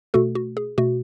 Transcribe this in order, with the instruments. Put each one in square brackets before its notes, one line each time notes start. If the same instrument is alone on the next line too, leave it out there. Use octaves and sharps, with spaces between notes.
[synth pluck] B2 A3 F#4 A4
F#4
G#4
B2 A3 F#4